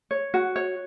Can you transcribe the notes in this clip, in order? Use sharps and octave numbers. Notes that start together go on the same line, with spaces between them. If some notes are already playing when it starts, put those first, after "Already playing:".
C#5
F#4
C#5